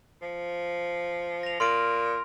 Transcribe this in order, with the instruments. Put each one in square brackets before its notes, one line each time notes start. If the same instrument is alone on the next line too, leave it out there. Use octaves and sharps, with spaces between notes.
[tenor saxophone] F3
[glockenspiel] A#6 F7
[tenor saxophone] A#2 [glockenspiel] C6 F6 D7